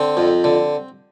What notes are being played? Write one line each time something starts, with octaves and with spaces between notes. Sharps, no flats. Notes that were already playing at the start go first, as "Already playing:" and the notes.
Already playing: D3 C4
F2
D3